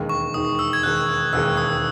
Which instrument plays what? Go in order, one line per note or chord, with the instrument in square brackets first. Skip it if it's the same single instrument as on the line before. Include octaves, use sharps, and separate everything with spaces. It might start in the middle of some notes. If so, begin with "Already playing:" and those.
Already playing: [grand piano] E1 D#2 D#3 G#3
[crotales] C#6
[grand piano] E1 D#2 D#3 G#3 [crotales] D#6
[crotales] E6
G#6
[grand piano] E1 D#2 D#3 G#3 [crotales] F#6
[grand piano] E1 D#2 D#3 G#3 [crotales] E6
[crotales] D#6